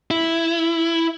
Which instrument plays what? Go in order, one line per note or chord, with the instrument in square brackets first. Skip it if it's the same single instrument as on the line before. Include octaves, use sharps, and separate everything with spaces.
[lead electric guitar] E4